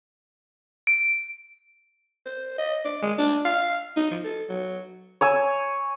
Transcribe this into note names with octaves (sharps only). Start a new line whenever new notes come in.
D7
C5
D#5
D5
G#3
D4
F5
D#4
F3
A4
F#3
C#5 G#5 E6